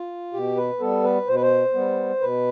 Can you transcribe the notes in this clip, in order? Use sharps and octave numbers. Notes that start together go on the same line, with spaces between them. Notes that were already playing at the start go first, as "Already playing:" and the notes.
Already playing: F4
B2 G4
B4
G3 B3 A4
B4
B2 C5
B4
C5
G3 B3
B2 B4